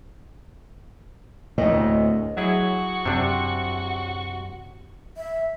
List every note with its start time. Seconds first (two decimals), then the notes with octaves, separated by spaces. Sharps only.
1.58 D2 A2 D#5
2.37 F#3 E4 F#4 G#4
3.06 F#2 C3 D4
5.17 E5